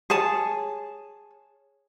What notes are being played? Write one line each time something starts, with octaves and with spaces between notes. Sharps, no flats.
G#4 C#5 A5